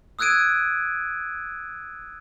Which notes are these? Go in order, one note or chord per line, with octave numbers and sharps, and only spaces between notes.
D#6 E6 F#6 G#6 D7 D#7